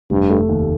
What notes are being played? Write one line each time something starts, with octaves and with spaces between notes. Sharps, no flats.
F1 G2
A3
D#2